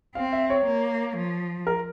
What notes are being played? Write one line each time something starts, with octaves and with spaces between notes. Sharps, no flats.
C4 F5
E5
C#5
A#3
F3
A#4